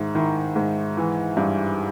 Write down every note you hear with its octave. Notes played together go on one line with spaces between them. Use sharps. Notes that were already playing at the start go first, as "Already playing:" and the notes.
Already playing: G#2 D#3 E4
D#3 E4
G#2
E3
G2